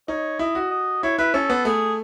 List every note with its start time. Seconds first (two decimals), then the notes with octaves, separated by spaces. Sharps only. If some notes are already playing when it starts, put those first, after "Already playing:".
0.08 D#4 C#5
0.39 E4 D#5
0.55 F#4
0.71 D#5
1.03 E4 C#5
1.18 E4 B4
1.34 C#4 A4
1.50 B3
1.65 A3 G#4